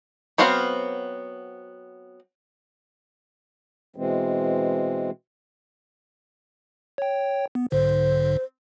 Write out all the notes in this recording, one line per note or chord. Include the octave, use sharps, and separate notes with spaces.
F#3 B3 C4 F5
B2 E3 G#3 C4
C#5 G5
B3
B1 G#2 D3 C5